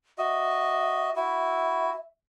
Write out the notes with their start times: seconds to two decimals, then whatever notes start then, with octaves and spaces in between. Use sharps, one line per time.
0.18 F#4 D#5 E5
1.16 E4 F#4 E5